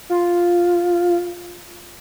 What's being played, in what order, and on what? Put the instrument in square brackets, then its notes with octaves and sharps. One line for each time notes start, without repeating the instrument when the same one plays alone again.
[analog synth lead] F4